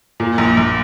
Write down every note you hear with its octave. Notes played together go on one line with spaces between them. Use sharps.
A#2
A#1
A#1